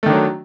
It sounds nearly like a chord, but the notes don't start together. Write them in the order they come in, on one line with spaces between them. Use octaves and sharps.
A3 D#3 D4 F#3